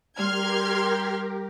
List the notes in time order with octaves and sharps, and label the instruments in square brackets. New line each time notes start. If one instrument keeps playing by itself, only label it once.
[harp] G3 [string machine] G4 A#4 [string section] C6 F6 G#6